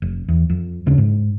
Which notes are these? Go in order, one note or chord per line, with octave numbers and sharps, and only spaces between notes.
F1
E2
F2
D#2 C#3 C#4 D4
G#2